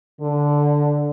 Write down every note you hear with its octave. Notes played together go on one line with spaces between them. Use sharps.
D3